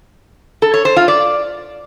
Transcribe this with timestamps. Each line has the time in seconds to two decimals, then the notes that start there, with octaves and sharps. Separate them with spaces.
0.62 A4
0.74 C#5
0.85 C5
0.96 F4
1.08 D5